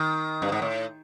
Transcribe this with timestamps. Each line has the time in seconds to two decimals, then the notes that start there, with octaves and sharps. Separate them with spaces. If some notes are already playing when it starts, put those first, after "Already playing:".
Already playing: D#3
0.42 G2
0.52 G#2
0.62 A2